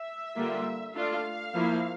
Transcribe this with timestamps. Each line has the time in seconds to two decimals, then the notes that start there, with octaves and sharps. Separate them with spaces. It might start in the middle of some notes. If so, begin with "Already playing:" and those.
Already playing: E5
0.36 D3 G3 A#3 F4
0.95 A3 D4 F4 F5
1.54 F3 A#3 E4